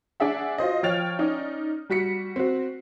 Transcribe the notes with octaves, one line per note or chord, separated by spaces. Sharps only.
D4 G#4 E5 F#5
F4 F#4 C5 D#5
F3 C#5 G5 F6 A6 F7
C#4 D#4 D5
G3 F#4 B6 C#7
C4 F#4